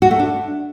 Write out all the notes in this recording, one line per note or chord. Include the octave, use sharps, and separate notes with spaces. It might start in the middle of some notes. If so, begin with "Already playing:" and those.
F#4
A3
D4